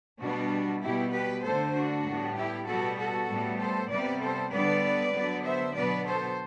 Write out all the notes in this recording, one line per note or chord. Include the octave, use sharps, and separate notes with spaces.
B2 G3 B3 D4 F#4
B2 G3 B3 E4 G4
G4 B4
D3 A3 A4 C5
D4 F#4
A2 G3 B3
E4 G4
B2 G3 B3 F#4 A4
F#4 A4
A2 G3 B3
A4 C5
C3 G3 B3 B4 D5
A4 C5
D3 G3 B3 B4 D5
D3 F#3 B3
C5 E5
B2 F#3 B3 B4 D5
A4 C5